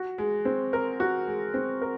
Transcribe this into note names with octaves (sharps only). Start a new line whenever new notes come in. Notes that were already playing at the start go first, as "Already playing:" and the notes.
Already playing: F#4
G#3
C4
A#4
F#4
G#3
C4
A#4